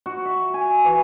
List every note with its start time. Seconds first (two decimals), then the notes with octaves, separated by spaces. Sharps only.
0.06 F#4
0.25 E5
0.54 G#5
0.85 E3